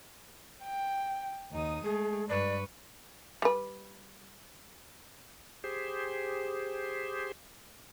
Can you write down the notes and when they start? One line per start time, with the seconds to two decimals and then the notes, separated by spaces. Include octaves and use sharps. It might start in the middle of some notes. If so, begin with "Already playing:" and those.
0.65 G5
1.52 D#2 D#4 D#6
1.84 G#3 A3 G#4
2.29 G2 B4 D5 C#6
3.42 G3 B4
5.64 G4 G#4 C5